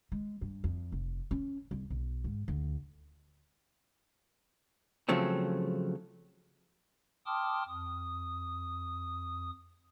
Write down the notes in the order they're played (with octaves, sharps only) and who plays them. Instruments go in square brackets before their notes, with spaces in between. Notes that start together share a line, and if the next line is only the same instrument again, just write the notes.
[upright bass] G#3
G2
F2
F1
C#4
C2
B1
G#2
D2
[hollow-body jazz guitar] C#3 F3 F#3 A3 C4
[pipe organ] G5 A5 C6 D6 D#6 F6
F2 D#6